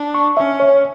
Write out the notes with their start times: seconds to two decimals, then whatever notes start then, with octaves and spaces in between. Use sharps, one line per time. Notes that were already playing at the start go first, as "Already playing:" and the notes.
Already playing: D4
0.15 C#6
0.37 C#4 E5
0.60 C#5